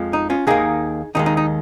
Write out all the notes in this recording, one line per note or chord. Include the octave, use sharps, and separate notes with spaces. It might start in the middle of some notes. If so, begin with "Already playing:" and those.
Already playing: F2 F3 G#3
D#4
C#4 F4
D#2 D#3 A#3 D#4 G#4
D#2 D#3 G#3 D#4
D#4
D#4